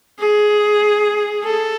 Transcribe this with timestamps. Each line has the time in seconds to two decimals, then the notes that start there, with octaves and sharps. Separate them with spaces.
0.19 G#4
1.44 A4